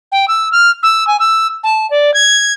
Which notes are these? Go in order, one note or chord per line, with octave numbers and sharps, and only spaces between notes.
G5
E6
F6
E6
G#5
E6
A5
D5
G#6